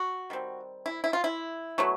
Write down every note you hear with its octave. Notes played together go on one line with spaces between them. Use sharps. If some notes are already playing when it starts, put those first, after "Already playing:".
Already playing: F#4
D#3 G3 C4
E4
E4
F4
E4
B2 F#3 A3